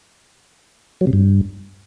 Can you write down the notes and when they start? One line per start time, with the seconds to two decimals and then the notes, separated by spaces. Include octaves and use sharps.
1.01 F#3
1.07 C3
1.13 G2